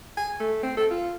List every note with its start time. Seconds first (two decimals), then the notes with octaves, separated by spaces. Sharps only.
0.17 G#5
0.40 A3
0.63 C4
0.77 A4
0.91 F4